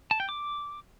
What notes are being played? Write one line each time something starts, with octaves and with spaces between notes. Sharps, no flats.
A5
G5
D6